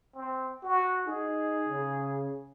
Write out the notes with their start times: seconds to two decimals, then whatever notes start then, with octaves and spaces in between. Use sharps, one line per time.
0.15 C4
0.63 F#4
1.07 D#4 G#4
1.69 C#3